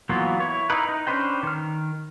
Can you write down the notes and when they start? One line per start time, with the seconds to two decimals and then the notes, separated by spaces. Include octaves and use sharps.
0.09 E3 F#3 A#3 B3 F4
0.40 E4 C#5
0.70 D#4 E4 A#4 B4
0.89 D#4
1.07 C#4 D4 B4 C5 G5
1.43 D#3 F6